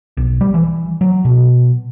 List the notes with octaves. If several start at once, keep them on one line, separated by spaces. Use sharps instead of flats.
B1
G3
E3
F#3
B2